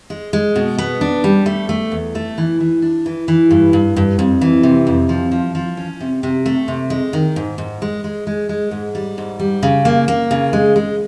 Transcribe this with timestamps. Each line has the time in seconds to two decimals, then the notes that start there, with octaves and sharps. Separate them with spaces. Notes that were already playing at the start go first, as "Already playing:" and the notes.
0.10 G#3
0.33 G#3
0.56 B2
0.78 B3
1.01 D4
1.24 G3
1.46 A3
1.69 A3
1.92 E2
2.15 A3
2.38 E3
2.60 E3
2.82 D4
3.06 E3
3.28 E3
3.51 G2
3.73 G2
3.96 G2
4.19 F2
4.41 E3
4.63 C3
4.87 F2
5.09 F3
5.32 F3
5.55 F3
5.77 C#4
6.00 C3
6.23 C3
6.46 A3
6.68 C3
6.90 G#3
7.13 D#3
7.36 G#2
7.58 G#2
7.82 G#3
8.04 G#3
8.27 G#3
8.49 G#3
8.71 G#2
8.95 G3
9.18 G#2
9.39 G3
9.63 C#3
9.85 A#3
10.08 A#3
10.31 C#3
10.53 G#3
10.76 G#3